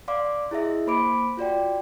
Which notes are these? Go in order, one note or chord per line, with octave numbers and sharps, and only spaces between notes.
D5 F5 C6 D6
E4 G#4 D#5 E5 A#6
A#3 C5 B5 C6 D6 D7
F4 F#4 D5 G5